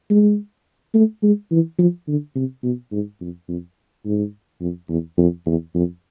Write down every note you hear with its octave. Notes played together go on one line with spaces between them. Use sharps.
G#3
A3
G#3
E3
F3
D3
C3
B2
G#2
F2
F2
G#2
F2
E2
F2
E2
F2